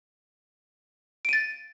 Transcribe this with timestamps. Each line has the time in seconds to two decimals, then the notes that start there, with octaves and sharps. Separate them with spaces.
1.25 D7
1.29 D#7
1.33 A6